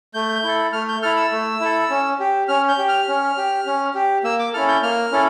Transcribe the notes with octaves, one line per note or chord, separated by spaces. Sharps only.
A3 G6
E4 A4
A3 F6
G6
E4 A4 F6
E6
A3
E4 A4
C#4
G4
C#4 F6
G6
G4
F6
C#4
G4
C#4
G4
A#3 E6
D6
C#4 E4 A4 F6
G6
A#3 F6
C#4 E4 A4